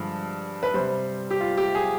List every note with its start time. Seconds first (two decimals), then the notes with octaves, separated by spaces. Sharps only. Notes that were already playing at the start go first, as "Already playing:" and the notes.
Already playing: G2 D3 F3 G#3
0.63 B4
0.74 C3 G3 C5
1.30 G4
1.41 F4
1.57 G4
1.75 G#4